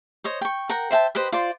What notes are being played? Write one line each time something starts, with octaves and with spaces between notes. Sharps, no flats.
C5 C#5 D#5
G5 C#6
A#4 F#5 G5 A#5
C5 E5 G5 A5
G4 B4 C5 D#5
F4 C5 D5